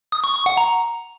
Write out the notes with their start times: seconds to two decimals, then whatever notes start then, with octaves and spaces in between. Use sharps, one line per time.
0.12 D#6
0.24 C#6
0.35 C#6
0.46 F#5
0.57 A#5